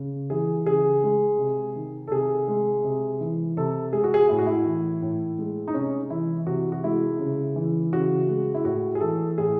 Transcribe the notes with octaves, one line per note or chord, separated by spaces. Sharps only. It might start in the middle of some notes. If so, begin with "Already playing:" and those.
Already playing: C#3
E3 G#4
C#3 G#4
G#3
C3
D#3
A4
C3 G#4
G#3
C3
E3
C3 A4
G#3 G#4
F#4
G#4
A2 E4
F#4
E4
E3
A2
G#3
D#4
C3 C#4
E3 E4
C3 F#4
F#4
G#3 E4
C#3
E3
C#3 F#4
G#3
E4
A2 F#4
G#4
E3 A4
A2 G#4